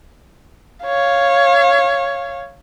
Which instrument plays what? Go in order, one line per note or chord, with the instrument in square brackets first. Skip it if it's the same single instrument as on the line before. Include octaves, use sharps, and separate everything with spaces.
[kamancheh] C#5 F5